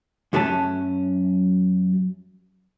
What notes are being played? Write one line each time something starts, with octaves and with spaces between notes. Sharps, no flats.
F#2 F#3 A3 C#4 A5